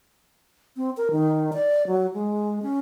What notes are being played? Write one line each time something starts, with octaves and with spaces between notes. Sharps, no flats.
C4
A#4
D#3
D5
F#3
G#3
C#4